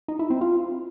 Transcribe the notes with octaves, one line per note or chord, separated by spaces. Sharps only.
D#4
E4
C4
F4